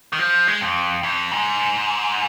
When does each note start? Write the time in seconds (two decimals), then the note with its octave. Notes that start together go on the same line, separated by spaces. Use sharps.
0.13 D#3
0.19 F3
0.47 G#3
0.61 F2
1.03 F2
1.31 G#2